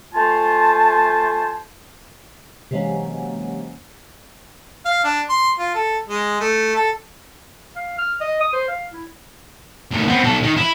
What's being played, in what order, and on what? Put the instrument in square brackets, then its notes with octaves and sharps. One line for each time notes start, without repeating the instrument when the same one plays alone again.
[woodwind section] A3 F4 C5 G#5 A5
[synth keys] C3 E3 F#3 G#3 A#3 C#4
[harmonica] F5
D4
C6
F4
A4
G#3
A3
A4
[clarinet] F5
F6
D#5
D#6
C5
F5
E4
[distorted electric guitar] D2 D#3
B3 C4
B1 A4
D#3
E4